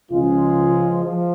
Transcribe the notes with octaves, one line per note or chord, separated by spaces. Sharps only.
C#2 C#3 F3 G#3 F4
F3